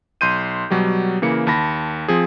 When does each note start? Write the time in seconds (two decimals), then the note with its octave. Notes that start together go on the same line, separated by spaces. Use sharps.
0.21 B1 C6 G6 D#7
0.70 B2 F#3 G3 G4
1.22 C#3 E3 A#3 C#7
1.47 D#2 A5 B5 A#6
2.08 F3 C4 G#4